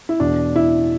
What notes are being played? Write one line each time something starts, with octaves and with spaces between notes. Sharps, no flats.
E4
E2 B2 D4
E4